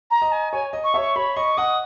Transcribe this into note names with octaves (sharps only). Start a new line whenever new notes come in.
A#5
D#5
G#5
C#5 G#5
D#5
C#6
C#5 E5
C#6
C#5 B5
D#5 C#6
D#5 F#5 D#6